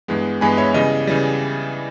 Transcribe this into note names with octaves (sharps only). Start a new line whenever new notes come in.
G2 E3 G#3 B3
G2 E3 G#3 B3 G#5 B5
C#5 E5
C#3 E3 G3 D#5
C#3 E3 G3